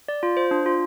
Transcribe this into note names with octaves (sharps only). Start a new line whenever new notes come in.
D5
F4
C5
D4
F4